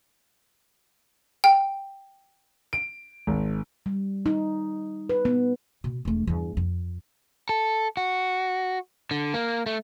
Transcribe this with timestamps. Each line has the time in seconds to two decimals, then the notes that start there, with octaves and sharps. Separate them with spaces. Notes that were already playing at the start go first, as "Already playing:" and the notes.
1.44 G5
2.73 D7
3.27 G#1
3.86 G3
4.26 D#4
5.09 B4
5.25 B3
5.84 B2
6.05 E1 A3
6.27 E2 G2
6.57 F2
7.49 A4
7.97 F#4
9.11 D3
9.34 A#3
9.66 A3